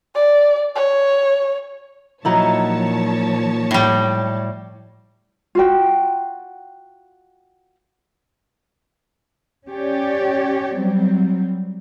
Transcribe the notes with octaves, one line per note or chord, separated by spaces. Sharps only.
D5
C#5
A#2 F3 F#3 D#4 E4 C#5 A5
A2 G3
F4 F#4 G5
C#4 G4 C#5 D5
F#3 G3 C4